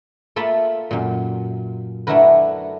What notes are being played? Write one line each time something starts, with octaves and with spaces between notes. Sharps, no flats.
A3 A#3 F4 E5 A5 B5
F#2 A#2
A3 D4 E4 F#4 A#4 B4